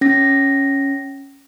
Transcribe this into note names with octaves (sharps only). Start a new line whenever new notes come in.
C#4 A#6